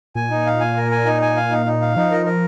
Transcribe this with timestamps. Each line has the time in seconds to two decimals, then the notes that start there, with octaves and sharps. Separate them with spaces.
0.15 A#2 G#5
0.30 D#4
0.47 F5
0.60 G#5
0.77 A#4
0.92 G#5
1.06 D#4
1.22 G#5
1.37 F5
1.51 D#4
1.66 D#4
1.81 F5
1.96 F3 D#4
2.12 A#4
2.26 A#4